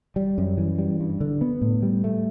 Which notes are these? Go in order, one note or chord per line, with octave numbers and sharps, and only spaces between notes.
G3
F#2
E3
G3
G2
D3
B3
A2
G3
A3